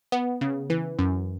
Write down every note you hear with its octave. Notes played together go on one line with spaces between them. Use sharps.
B3
C#3
E3
F#2